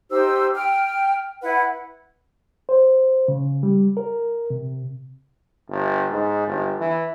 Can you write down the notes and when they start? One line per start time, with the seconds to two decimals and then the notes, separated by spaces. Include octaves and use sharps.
0.10 D#4 G4 C5 E6
0.55 G5 F6
1.42 E4 B4 F#5
2.69 C5
3.28 C#3
3.63 G3
3.97 A#4
4.50 C3
5.70 G1
6.11 G#2
6.47 G1
6.80 E3